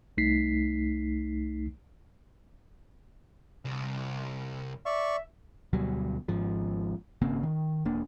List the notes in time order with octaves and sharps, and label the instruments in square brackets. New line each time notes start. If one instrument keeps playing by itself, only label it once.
[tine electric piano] C2 A3 D#4 B6 C7
[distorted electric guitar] C2
[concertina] D5 C#6 [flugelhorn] E5
[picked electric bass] D2 B2 F#3 G3
G#1 G#2 F3
G#1 C#3 A#3 C4
D#3
E1 A#3 D4